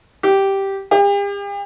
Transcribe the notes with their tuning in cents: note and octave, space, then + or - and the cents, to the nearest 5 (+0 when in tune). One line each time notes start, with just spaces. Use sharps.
G4 -5
G4 +45